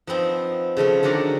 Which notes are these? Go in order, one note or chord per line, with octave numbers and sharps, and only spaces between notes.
F3 B3 C4 D#4
C#3 F3 A3 F4
D3 D#3 F#3 D4 G4 A#4